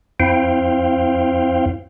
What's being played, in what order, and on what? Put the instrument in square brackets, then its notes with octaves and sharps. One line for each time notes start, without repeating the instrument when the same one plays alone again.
[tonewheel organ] F2 C4 E4 C5 F5 G5